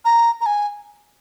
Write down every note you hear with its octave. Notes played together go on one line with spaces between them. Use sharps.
A#5
A#5
G#5